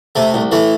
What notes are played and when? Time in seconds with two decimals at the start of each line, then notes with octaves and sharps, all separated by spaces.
0.16 C3 A3
0.34 C2
0.52 E3 A3